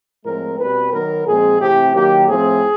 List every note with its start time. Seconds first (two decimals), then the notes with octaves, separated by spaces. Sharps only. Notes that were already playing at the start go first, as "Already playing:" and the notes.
0.23 A2 F3 G#3 C4 A#4
0.58 B2 G3 C4 B4
0.92 D#3 F#3 B3 A#4
1.25 A#2 F3 G#3 C4 G#4
1.59 C3 E3 A3 C4 G4
1.93 D#3 F#3 A#3 G4
2.27 A2 F3 A3 C4 G#4